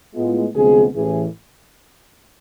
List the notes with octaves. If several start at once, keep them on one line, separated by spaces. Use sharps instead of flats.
A2 G#3 B3 F4
D2 C3 F3 G#3 B3 G#4
A1 A2 E3 G#4